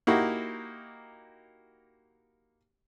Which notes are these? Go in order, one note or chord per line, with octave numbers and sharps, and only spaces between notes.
A#3 D#4 E4 F#4 G4